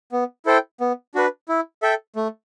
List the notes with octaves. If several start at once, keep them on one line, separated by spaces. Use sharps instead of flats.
B3
E4 A4 C5 G5
B3
D4 F#4 B4
E4
A4 E5 G5
A3